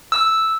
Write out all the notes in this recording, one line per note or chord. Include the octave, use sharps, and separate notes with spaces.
E6